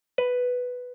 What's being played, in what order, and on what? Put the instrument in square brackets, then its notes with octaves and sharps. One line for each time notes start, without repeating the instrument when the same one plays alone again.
[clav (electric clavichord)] B4